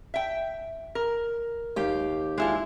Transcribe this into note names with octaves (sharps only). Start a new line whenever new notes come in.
E5 G5
A#4
D#2 G4 F5
G#3 E4 F4